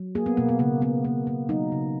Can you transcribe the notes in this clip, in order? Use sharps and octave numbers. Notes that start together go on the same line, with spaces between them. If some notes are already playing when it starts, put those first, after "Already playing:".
Already playing: F#3
A#3 G#4
B3
B2 A#3
B3
C#3 A#3
A#3 B3
A#3
A#3
F#3 D#4
C#3